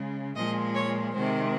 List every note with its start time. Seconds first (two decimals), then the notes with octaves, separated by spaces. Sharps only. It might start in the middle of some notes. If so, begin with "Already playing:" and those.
Already playing: C#3 G#3
0.36 A#2 F3 G#3 D#5
0.75 C#5
1.14 C3 D#3 G#3 C5